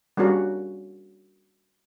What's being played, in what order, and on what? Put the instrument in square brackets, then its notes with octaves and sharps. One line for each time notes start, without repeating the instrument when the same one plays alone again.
[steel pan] G3 A#3 C#4 D4 F#4